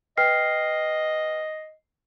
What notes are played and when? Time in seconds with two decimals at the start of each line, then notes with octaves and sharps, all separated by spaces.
0.18 B4 D#5 G5 F6 C7